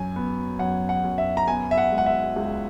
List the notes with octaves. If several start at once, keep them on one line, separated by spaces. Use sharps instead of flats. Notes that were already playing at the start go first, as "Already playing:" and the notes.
Already playing: F#2 G#5
B3
F#2 F#5
F#5
F#2
E5
A#5
B3 G#5
E5
F#5
G#3
F#5
E5
C#2